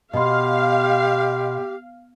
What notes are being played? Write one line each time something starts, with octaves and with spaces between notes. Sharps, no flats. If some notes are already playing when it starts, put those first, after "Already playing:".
B2 G4 D#5 F5 B5 C6